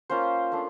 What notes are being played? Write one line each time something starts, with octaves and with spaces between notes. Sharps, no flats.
A#3 C#4 F4 C5
A3 D4